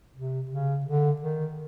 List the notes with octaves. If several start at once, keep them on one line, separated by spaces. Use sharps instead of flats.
C3
C#3
D3
D#3